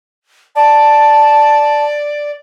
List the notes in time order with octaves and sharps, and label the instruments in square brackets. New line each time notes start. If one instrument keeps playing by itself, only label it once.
[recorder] D5 [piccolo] A5